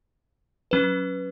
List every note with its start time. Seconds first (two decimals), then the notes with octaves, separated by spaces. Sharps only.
0.71 F#3 C#4 B4